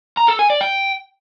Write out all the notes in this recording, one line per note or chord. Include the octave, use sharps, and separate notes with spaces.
A#5
A4
G#5
D5
G5